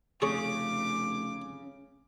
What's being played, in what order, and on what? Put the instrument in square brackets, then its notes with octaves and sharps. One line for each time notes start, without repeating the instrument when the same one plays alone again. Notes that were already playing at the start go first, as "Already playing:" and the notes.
[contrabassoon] F1 [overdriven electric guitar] C#3 [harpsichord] G#4 C#5 C#6 [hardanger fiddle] D6